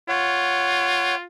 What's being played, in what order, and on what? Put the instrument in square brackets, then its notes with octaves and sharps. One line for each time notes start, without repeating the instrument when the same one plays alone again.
[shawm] F4 [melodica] C#5 F#5